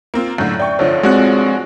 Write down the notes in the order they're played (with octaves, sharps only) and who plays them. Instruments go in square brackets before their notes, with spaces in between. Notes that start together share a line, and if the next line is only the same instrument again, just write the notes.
[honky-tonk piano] A#3 C4 F4
[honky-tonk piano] F#2 A2 D3 [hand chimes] G6
[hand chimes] D5 E5 [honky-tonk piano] G5 C#6
[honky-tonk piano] F1 D3 F3 [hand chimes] C#5
[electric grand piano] G#3 F#4 F#6 [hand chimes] C4 C#5 D5